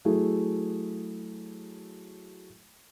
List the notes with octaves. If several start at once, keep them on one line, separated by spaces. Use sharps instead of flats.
F#3 A3 E4 G#4